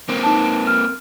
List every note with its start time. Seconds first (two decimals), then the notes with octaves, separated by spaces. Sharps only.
0.09 A#3 C4
0.23 D#4 A5
0.67 F6